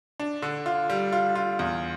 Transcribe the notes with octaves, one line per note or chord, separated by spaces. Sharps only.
D4
D3
F4
G3
F4
F4
E2